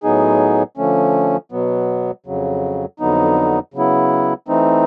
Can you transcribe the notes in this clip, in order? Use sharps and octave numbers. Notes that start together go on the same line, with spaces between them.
A2 F#3 B3 D#4 G#4
D3 F3 A3 C#4
B2 F#3 B3
F2 C#3 F#3
F2 D3 F#3 B3 D#4
C#3 F#3 B3 E4
E3 A3 C4 D#4